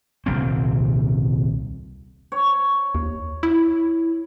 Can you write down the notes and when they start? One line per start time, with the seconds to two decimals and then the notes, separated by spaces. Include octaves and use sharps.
0.26 D#1 C2 C4
2.32 C#5
2.95 D#2
3.43 E4